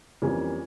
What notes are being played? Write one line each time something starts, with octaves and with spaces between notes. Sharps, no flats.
F2 E3 G3 A#3 C#4